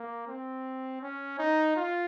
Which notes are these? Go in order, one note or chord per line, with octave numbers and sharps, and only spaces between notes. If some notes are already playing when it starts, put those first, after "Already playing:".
Already playing: A#3
C4
C#4
D#4
F4